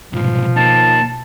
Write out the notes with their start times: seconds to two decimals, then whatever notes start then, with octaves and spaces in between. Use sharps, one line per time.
0.13 C2 G#2 B2 F3
0.56 A#3 D#4 A5